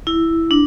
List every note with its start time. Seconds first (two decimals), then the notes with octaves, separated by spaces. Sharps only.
0.07 E4
0.51 D4